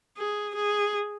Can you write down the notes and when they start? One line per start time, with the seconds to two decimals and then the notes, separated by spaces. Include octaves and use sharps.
0.17 G#4
0.55 G#4